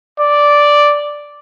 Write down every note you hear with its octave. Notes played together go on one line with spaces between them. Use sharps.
D5